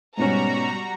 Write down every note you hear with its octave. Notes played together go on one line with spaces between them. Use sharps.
G#2 B2 G3 C#4 F#4 A#5